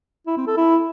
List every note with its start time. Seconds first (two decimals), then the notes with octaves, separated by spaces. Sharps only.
0.27 E4
0.37 C4
0.47 A4
0.57 E4